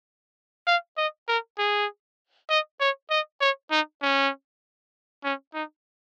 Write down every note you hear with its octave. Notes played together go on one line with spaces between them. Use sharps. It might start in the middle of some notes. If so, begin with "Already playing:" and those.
F5
D#5
A#4
G#4
D#5
C#5
D#5
C#5
D#4
C#4
C#4
D#4